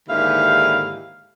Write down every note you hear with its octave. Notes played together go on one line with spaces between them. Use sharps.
D#2 G#2 D3 E4 G4 F5